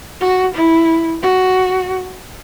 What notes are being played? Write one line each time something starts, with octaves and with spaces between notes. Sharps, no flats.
F#4
E4
F#4